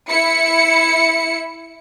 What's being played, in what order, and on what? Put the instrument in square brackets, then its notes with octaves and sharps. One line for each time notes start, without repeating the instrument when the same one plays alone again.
[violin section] E4 C#7